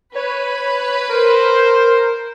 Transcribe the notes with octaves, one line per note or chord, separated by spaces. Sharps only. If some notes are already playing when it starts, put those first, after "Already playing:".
B4 C#5
A#4 C5